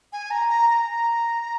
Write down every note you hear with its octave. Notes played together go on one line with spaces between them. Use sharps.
G#5
A#5
A#5
A#5